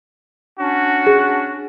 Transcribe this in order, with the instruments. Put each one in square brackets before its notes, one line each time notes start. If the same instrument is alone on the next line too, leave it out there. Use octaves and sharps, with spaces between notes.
[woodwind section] C#4 D4 [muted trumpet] F#4
[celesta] G#4